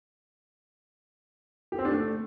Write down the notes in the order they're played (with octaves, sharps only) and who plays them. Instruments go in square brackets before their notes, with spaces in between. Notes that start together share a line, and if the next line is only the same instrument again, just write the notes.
[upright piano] G4
C4
D4
A3